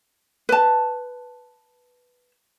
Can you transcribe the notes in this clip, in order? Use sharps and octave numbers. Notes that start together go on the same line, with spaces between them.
B4 A5